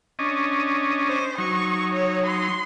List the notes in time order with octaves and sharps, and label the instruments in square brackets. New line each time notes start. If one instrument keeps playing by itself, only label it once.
[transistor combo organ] C#4 D4 D#5
[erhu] C5
[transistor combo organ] F#3 D#4 [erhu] C#6
[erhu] C#5
C6